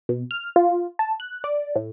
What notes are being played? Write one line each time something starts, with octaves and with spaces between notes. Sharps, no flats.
B2
F6
F4
A5
F#6
D5
A2